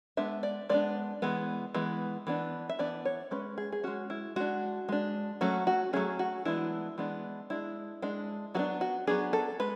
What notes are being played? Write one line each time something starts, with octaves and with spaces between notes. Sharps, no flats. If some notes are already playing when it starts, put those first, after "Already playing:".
G#3 B3 D4 E5
D5
G#3 B3 D4 D5
E3 G#3 B3
E3 G#3 B3
E3 B3 D4
E5
E3 B3 D4 D5
C#5
G#3 C#4 B4
G#4
G#4
G#3 C#4 F#4
E4
G#3 D4 F#4
G#3 D4
F#3 A3 C#4 F#4
F#4
F#3 A3 C#4 G#4
F#4
E3 G#3 B3 D4 E4
E3 G#3 B3 D4
G#3 D4 E4
G#3 D4
F#3 B3 D4 F#4
F#4
F#3 B3 D4 G#4
A4
G#3 B4